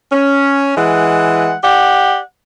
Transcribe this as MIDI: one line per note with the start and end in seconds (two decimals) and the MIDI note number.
0.12 0.72 61
0.77 1.54 52
0.77 1.54 56
0.77 1.54 78
1.61 2.18 67
1.61 2.18 74
1.61 2.18 78